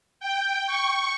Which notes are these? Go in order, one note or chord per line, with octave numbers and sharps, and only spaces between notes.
G5
C#6